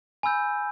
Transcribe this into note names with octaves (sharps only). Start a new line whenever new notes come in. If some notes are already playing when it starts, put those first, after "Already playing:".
G#5 B5 E6 G6